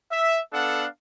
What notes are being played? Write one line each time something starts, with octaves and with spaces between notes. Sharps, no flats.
E5
B3 D4 A4 F5 F#5